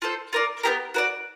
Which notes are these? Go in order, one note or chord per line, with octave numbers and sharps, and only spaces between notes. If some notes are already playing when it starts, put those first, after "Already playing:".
F4 A4 C5
F4 A#4 D5
B3 D4 G4 A#4
F#4 A#4 D5